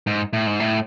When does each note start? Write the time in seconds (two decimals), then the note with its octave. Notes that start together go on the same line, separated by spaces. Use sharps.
0.07 G#2
0.33 A2
0.46 G#2
0.60 A2